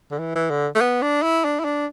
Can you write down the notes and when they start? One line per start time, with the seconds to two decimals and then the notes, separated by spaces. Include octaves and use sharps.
0.11 D3
0.19 E3
0.35 E3
0.51 D3
0.75 A3
0.81 B3
1.02 D4
1.23 E4
1.45 D4
1.60 E4
1.65 D4